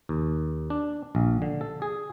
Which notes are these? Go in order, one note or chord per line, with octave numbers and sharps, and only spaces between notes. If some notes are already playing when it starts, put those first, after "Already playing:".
D#2
D4
A#1
D3
A4
G#4